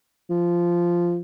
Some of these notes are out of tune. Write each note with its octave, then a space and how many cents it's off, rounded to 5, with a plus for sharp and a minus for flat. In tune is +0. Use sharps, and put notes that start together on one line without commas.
F3 -10